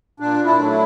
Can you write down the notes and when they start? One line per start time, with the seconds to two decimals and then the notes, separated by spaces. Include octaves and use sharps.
0.20 A#2 D4
0.45 D4 E4
0.58 F#3 A3
0.71 E4